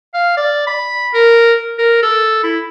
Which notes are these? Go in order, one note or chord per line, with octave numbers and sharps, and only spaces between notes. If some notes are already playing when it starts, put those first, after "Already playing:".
F5
D5
B5
A#4
A#4
A4
E4